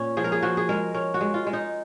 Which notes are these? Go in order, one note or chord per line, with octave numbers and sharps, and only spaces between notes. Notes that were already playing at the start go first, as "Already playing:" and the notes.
Already playing: A#2 C#4
F3 G#4
A#4
G#4
F3 F#4
G#4
G#3 A#4
C#4 A#4
F#4
G#3
F4
G#3
D#4